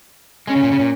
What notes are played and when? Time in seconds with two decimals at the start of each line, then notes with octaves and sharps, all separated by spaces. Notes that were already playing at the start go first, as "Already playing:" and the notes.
0.47 G#3 C#4
0.56 C#3
0.64 A#2
0.72 C#3
0.80 A#2